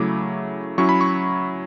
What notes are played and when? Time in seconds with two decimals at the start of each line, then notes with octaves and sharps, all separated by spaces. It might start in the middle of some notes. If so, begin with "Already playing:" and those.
Already playing: C#3 F#3 A3 E4 D6
0.78 F#3 C#4 E4 C#6
0.89 B5
1.01 C#6